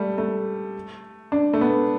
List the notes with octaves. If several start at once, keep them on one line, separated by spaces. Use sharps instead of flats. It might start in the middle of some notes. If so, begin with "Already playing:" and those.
Already playing: G3 A3
A3
D4
A3
B3